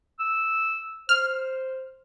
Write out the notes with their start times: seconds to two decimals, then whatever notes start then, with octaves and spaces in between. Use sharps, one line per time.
0.19 E6
1.09 C5 F6